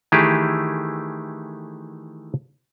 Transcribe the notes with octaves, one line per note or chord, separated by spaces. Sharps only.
D#3 E3 A3 E4 G4 G#4